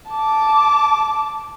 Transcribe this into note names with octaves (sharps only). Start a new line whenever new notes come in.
A5 D6